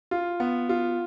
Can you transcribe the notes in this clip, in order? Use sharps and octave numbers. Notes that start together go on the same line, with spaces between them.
F4
B3
F4